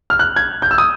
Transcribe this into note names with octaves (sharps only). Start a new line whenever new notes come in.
F6
F#6
G#6
G6
E6
D#6